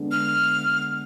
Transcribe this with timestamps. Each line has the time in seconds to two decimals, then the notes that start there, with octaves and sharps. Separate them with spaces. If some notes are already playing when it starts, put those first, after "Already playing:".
Already playing: D3 G#3 B3 D4
0.11 F6